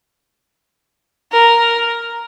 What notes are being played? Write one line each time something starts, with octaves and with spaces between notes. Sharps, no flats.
A#4